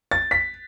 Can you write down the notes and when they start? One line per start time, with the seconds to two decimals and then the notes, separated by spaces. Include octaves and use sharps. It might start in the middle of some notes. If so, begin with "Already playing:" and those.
0.11 A6
0.31 B6